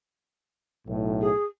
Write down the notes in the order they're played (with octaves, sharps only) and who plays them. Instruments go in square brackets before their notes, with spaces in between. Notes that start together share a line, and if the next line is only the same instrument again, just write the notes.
[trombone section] B1 A2
[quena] G#4